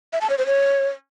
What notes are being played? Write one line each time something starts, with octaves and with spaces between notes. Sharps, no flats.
E5
A5
C#5
C5
C#5